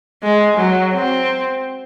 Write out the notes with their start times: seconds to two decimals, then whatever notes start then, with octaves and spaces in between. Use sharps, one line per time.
0.23 G#3
0.58 F#3
0.94 C4